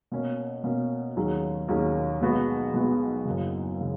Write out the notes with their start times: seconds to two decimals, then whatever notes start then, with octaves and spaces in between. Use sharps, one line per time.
0.12 B2 A#3 C#4
0.64 B2 A#3 C#4
1.16 D#2 D#3 F#3 C#4 G#4
1.68 D#2 D#3 F#3 C#4 G#4
2.21 B1 B2 G#3 B3 F#4
2.73 B1 B2 G#3 B3 F#4
3.25 F#1 F#2 C#3
3.81 C#3